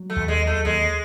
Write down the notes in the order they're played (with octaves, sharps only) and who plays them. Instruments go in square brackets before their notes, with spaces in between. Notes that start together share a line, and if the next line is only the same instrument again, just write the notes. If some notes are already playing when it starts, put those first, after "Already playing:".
Already playing: [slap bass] F#3
[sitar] A3
[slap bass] D#2
[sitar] G#3
[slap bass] F#3
[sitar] A3
[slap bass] D#2 [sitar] G#3